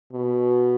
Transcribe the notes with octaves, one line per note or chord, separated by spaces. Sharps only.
B2